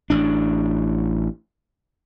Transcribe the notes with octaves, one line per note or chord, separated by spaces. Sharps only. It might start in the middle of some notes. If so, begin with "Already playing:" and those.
A1 D4